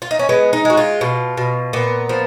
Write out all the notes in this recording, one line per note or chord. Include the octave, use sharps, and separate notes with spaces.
F4
D#4
C#4
G#3 B3
D#4
G#3 F#4
F4
B2
B2
A#2 B3
F3